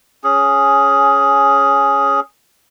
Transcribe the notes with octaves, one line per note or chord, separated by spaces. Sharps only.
C#4 G#4